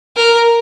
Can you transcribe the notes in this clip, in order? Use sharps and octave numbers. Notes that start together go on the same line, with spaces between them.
A#4